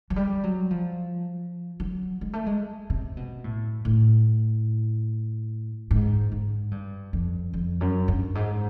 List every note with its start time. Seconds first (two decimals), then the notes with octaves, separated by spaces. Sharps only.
0.10 F#3
0.16 G3
0.43 F#3
0.71 F3
1.80 F#3
2.21 G#3
2.33 A3
2.46 G#3
2.90 C3
3.17 B2
3.44 A2
3.85 A2
5.91 G#2
6.32 G#2
6.71 G2
7.13 F2
7.54 F2
7.81 F#2
8.08 G2
8.35 G#2